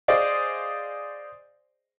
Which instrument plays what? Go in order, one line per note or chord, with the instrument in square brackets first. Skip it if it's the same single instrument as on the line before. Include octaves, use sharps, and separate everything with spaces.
[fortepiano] G#4 C5 D5 D#5 F5